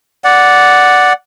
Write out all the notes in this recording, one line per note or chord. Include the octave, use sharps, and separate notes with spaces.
D5 F#5